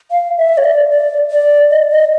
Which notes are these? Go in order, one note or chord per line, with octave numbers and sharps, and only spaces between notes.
F5
E5
C#5
D5
D5
D5
D#5
D#5